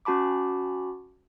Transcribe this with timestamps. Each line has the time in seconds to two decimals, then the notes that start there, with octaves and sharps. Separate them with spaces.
0.05 C#4 F#4 A5 B5 D6